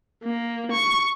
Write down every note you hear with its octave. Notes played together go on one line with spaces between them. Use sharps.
A#3
C#6